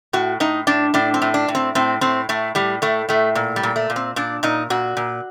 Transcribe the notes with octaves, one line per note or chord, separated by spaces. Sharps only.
A2 F#4
A2 D#4
A2 D4
A2 D4
C4
A2
D4
A2
C4
A2 C4
A2 C4
A2 A3
A2 G3
A2 A3
A2 A3
A#2
G3
A#2
A3
A#2
C4
A#2 D4
A#2 D#4
A#2 F#4
A#2